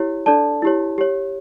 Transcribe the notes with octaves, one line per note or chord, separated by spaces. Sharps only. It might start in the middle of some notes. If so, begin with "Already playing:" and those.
Already playing: E4 G4 C#5
D4 A4 D5 A5
E4 G4 C#5
G4 C#5